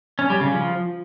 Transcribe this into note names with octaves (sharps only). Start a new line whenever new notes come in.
C#4
G3
C#3
F3